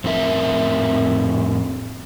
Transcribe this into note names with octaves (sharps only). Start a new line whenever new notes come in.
F2 A2 C4 A#4 E5